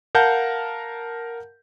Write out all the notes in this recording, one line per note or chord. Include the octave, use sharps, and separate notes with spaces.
A#4 F5 F#5 A5 G6